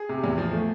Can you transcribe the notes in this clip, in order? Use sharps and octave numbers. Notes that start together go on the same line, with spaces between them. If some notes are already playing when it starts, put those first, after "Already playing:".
Already playing: G#4
C3
E2
F3
A3